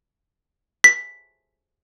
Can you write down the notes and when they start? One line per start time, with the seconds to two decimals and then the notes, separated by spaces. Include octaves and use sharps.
0.84 B6